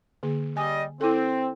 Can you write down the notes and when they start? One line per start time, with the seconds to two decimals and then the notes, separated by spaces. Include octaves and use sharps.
0.23 D3 A#3 G#4
0.57 G3 D#5 G#5
1.01 C4 E4 A4